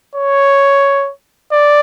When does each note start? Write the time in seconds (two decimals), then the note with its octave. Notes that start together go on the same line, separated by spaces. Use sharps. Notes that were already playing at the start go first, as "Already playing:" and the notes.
0.15 C#5
1.51 D5